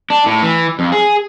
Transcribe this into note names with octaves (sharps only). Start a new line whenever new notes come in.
D4
A2
E3
F2
G#4